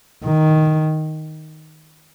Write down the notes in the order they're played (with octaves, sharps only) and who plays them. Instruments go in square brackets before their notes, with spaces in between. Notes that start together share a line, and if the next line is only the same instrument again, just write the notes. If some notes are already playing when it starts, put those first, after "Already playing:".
[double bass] D#3